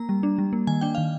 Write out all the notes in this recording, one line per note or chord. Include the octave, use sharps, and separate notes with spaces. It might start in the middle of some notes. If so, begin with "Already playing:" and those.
Already playing: A#3 A#5
G3
D4
G3
A#3
D#3 G#5
D4 G5
D#3 F5